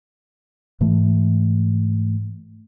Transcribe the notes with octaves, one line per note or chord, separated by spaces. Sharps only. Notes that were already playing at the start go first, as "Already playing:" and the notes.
G#2 E3 A3